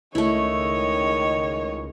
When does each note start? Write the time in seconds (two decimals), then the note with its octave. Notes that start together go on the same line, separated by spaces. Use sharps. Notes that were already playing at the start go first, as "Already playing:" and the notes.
0.15 C#2 D#3 A3 E4 C#5 D#5